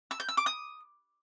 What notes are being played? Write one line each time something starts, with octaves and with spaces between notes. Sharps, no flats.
E6
G6
E6
D6
D#6